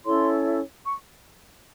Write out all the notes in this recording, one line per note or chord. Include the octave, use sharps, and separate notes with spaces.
C#4 E4 A4 C#5 C6
C#6